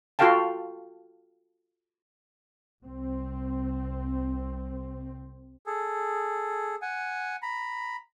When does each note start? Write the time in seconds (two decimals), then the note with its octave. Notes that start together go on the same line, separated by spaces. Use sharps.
0.19 F4 F#4 A4 F5 G5 A5
2.83 C2 C4
5.67 G#4 A4
6.82 F#5 G#5
7.42 A#5 B5